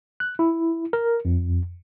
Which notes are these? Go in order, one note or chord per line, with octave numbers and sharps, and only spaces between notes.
F#6
E4
A#4
F2